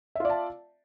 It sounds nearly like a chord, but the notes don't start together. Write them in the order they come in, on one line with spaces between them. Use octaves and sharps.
E5 F4 D5 A5